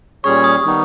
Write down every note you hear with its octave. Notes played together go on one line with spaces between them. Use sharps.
A#2 G3 C#4 G#4 C#5 C#6
D#6
D#3 G3 B3 D#4